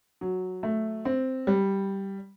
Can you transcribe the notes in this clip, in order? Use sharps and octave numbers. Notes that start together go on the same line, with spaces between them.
F#3
A3
C4
G3